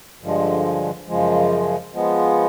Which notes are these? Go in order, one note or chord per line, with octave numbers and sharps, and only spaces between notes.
G2 D3 F3 G#3
F#2 C#3 F3 G#3
F3 G#3 B3